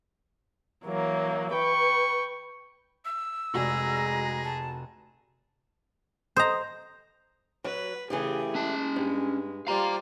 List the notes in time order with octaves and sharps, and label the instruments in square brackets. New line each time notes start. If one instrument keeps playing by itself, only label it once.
[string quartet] E3 F#3 A#3
[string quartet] B4 G5 [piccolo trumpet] C#6
[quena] E6
[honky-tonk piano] F1 F#4 D5 [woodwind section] G#3 A#5 [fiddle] G#4
[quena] A5
[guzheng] C5 A#5 [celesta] D#5 D#6 G6
[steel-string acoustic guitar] F#3 [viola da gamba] B4
[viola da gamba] C#3 G#4 [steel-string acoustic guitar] E3 A3 G4
[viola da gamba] G#3 [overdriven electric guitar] C#4 A5
[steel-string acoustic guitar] G2
[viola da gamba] G3 F4 C5 [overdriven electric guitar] F5 A#5